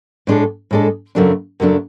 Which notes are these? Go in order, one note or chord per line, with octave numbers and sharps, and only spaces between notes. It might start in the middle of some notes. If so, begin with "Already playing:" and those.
A2 G#3 D4 A4
A2 G#3 D4 A4
F#2 C#3 F#3 A3 D4
F#2 C#3 F#3 A3 D4